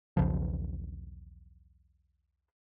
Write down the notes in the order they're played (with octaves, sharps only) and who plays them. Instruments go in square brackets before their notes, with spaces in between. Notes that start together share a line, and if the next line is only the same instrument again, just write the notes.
[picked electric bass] B1 E2 C#3 F3